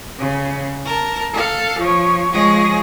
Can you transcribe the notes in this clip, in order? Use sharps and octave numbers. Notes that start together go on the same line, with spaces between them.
C#3
A#4 A5
A4 F5
F3 C#5
F3 G#3 G#4 C#5 D#5 A#6